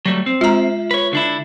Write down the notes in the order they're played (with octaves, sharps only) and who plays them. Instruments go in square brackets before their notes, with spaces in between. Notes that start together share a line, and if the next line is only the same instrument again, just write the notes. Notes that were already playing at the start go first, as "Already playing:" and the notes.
[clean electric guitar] F#3 G3 A3
C4
[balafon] G#3 A#5 [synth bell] F4 E5
[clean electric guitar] B4 C#5
D3 D4 E4